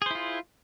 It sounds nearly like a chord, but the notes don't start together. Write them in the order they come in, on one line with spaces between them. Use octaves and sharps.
G#4 C5 E4 F4